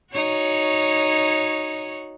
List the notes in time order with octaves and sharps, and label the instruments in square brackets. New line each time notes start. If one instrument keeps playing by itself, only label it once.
[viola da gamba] D#4 F#4 C#5